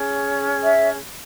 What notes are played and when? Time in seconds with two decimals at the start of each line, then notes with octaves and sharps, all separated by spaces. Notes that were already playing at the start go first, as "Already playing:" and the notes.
Already playing: C#4 G#4 C#5
0.63 E5